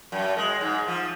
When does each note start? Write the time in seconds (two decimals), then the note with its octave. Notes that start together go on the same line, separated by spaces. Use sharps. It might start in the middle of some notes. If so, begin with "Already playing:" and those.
0.12 F#2
0.37 G#3
0.61 G#2
0.88 F3